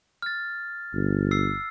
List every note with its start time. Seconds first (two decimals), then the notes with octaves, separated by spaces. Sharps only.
0.22 F6 A6
0.94 G1
1.31 E6 C7